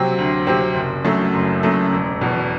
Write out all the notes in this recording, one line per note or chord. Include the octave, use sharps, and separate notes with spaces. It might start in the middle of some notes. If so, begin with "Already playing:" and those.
Already playing: C3 F#3 C4
D2
C3 F#3 C4
F#1
F#2 F#3 A3
F#1
F#2 F#3 A3
E1
E2 B2